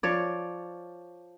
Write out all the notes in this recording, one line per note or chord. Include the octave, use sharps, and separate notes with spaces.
F3 C#5 D5